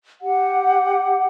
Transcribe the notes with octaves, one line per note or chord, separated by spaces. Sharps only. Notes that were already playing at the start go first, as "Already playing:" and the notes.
G4 F#5